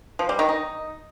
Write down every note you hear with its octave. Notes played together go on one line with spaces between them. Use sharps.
F3
G3
D#3
D#4